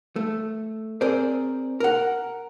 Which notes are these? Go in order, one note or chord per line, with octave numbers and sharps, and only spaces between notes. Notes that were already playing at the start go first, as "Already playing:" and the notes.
A3
C4 G#4 A#4 C5 D5
A#4 F#5